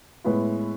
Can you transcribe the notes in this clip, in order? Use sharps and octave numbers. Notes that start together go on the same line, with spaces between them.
A2 G#3 B3 E4